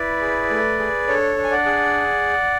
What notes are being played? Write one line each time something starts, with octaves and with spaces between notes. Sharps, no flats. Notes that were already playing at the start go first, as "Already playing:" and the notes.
Already playing: E4 B4 D5
G#4
A3
G#4
D4 A4 C#5
D4
G#5
D5 F#5
G#4